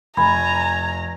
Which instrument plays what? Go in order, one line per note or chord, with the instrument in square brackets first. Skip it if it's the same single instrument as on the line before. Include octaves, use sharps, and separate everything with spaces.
[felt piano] F1 [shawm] G#5 [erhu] A#5 [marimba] B5